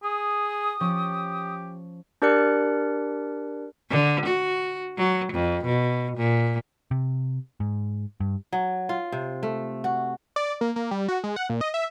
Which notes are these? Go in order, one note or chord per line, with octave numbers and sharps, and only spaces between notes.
G#4 D#6
F3 C#4 G4 C#6
D4 G4 A#4 D5 F#6 C#7
D3
F#4
F#3
F2
B2
A#2
C3
G#2
G2
F#3
F4
C3
A3
F#4
D5
A#3
A#3
G3
F#4
G#3
F#5
A#2
D#5
E5